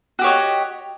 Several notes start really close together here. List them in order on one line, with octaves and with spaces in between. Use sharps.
F#4 G4 C#5 D#5